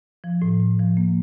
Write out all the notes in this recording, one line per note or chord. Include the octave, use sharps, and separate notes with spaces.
F3
A2
A2
F3
A#3